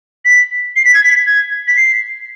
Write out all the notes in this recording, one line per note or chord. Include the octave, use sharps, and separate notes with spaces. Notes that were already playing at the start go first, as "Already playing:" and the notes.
B6
C7
B6
G#6
B6
G#6
B6
C7